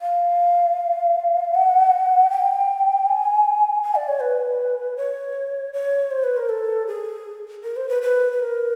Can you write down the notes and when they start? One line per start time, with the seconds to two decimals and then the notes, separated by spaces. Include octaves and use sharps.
0.01 F5
1.54 F#5
2.31 G5
3.06 G#5
3.83 G#5
3.95 D5
4.08 C#5
4.20 B4
4.97 C#5
5.73 C#5
6.11 C5
6.24 B4
6.37 A#4
6.49 A4
6.87 G#4
7.64 A#4
7.76 C5
7.89 B4
8.02 B4
8.32 B4
8.40 A#4